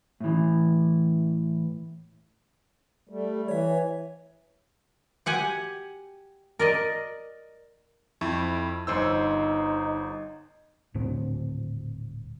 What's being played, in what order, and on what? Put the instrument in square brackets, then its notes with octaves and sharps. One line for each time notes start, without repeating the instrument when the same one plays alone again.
[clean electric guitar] A2 E3
[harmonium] G3 A3
[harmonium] E3 [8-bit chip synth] C#5 E5
[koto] G4 F#5 G#5
A#4 D5 D#5
[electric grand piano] F2 E4 C#6
[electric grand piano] G1 C5 E6 [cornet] D#4
[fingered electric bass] D#1 A2 D3 C4